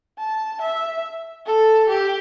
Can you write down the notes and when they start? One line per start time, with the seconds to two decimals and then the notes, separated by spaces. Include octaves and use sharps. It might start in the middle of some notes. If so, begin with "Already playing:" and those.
0.19 A5
0.61 E5
1.47 A4
1.89 G4